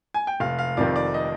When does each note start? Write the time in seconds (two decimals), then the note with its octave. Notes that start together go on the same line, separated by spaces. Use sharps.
0.14 G#5
0.27 G5
0.40 F1 F5
0.59 F5
0.77 F2 C3 D#3 D5
0.96 D5
1.14 D#5